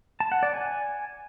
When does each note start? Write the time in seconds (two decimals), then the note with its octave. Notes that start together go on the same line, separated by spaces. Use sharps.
0.20 A5
0.32 F#5
0.43 D5
0.54 G#5